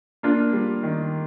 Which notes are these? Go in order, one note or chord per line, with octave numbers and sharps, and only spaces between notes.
A#3 D4 F4
G3
D#3